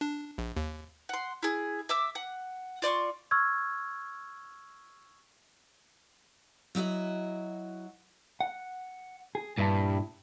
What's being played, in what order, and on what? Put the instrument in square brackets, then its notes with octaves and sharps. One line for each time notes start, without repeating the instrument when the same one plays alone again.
[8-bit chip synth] D4
A#1
D#2
[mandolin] F#5 C6
E4 G#4
E5 D6 E6
F#5
F4 D5 C6 C#6
[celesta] C#6 E6 F6 G#6
[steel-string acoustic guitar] F#3 E4 F#4 D#5
[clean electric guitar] F#5
G#4
[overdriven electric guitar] G2 [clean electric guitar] A#2 E4 A5